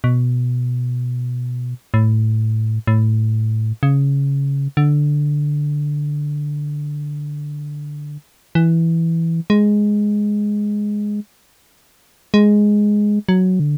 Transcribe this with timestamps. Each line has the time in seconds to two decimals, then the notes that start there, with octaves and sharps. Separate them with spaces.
0.04 B2
1.94 A2
2.87 A2
3.83 C#3
4.77 D3
8.55 E3
9.50 G#3
12.34 G#3
13.29 F#3
13.60 D3